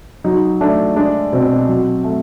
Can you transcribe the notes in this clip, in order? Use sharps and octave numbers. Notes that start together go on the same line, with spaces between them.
F#3 D#4
A3 D4
G#3 D4
B2 C4
F#3
A3